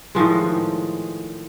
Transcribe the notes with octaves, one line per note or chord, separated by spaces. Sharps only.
A2 D#3 F3 G#3